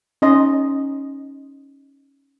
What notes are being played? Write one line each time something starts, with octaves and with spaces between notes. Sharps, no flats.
C#4 D#4 D#5 C6